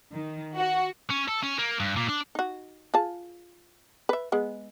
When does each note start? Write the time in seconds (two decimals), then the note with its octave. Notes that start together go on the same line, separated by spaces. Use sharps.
0.13 D#3
0.58 F#4
1.10 C#4
1.28 A4
1.43 C#4
1.58 A#3
1.80 G2
1.96 A#2
2.09 D4
2.35 D#4 F#4
2.94 F4 G#4 A5
4.09 B4 E5
4.32 G#3 B3